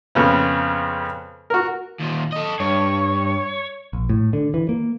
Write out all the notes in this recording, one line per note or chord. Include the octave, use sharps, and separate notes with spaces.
F2 C#3 B3
F#4 A#4
D#2 A#2
A4 D#5
G2 C#5
A#1
A2
D3
E3
A#3